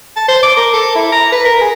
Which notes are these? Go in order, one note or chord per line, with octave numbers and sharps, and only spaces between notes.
A5
C5
D6
A#4
A4
E4
A#5
B4
A#4
G#4